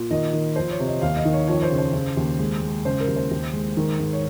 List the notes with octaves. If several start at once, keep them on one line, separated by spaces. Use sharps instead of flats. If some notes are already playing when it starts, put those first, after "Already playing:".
Already playing: A#2
D#3 D#5
D#3
F3 C5
C#5
C3
D#5
D#2 F5
D#5
D#3
C#5
F2 C#5
C5
C#3
C5
C#3
D#2
G#3
G#3
C#3 C5
A#4
D#2
C5
D#2
G#3
D#3
G#2
C#5